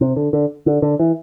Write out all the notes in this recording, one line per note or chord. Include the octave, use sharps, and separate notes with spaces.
C3
D3
D3
D3
D3
E3